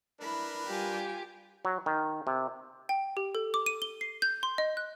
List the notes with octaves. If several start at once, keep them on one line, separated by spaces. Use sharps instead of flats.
D4 E4 A#4 B4 B5
G3 F4 G4 G#5
F#3
D#3
C3
G5
G4
A4
D6
D#7
G7
C7
G6
C6
D#5
F#6